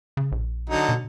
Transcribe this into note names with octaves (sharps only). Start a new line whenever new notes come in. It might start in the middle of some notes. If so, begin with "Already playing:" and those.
C#3
A#1
D3 F#3 D#4
B2